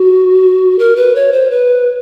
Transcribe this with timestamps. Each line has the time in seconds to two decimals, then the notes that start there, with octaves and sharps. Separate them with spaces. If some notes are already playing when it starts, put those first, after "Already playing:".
Already playing: F#4
0.79 A#4
0.96 B4
1.15 C#5
1.32 C5
1.51 B4